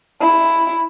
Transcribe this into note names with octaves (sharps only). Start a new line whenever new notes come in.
E4